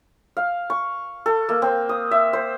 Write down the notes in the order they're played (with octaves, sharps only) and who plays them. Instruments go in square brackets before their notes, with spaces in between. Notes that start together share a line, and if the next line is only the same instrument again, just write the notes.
[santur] F5
C#6
A4
A#3
C4
D#6
E5
C5